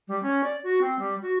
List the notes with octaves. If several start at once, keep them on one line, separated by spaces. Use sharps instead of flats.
G3
C#4
D5
F#4
C4
G3
F#4